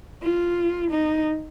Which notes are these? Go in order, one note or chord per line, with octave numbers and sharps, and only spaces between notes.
F4
D#4